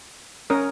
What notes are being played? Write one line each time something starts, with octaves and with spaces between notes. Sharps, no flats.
C#4 A#4 C#5 D#6